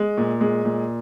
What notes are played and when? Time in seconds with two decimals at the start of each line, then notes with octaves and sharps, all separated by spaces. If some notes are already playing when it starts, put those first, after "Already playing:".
Already playing: G#3
0.18 A#2
0.40 G#3
0.65 A#2